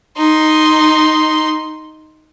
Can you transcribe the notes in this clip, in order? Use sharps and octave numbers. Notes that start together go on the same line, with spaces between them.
D#4 C6